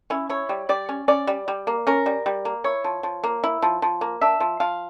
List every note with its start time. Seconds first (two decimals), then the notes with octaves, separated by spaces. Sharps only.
0.10 C#4 E4
0.29 E4 C#5
0.49 G3
0.69 G3 D5
0.89 C#4
1.08 C#4 D5
1.27 G3
1.48 G3
1.67 A#3
1.87 C#4 A#4
2.06 G3
2.26 G3
2.45 A#3
2.64 E4 C#5
2.84 F3
3.03 F3
3.24 A#3
3.44 E4
3.62 F3
3.82 F3
4.01 A#3
4.21 D4 E5
4.40 F3
4.60 F3 F5